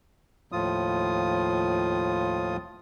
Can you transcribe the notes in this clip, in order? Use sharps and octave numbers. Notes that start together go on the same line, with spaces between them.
D#2 A2 F3 F4 D#6